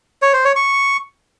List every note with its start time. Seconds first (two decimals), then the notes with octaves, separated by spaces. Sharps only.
0.22 C#5
0.33 C5
0.45 C#5
0.56 C#6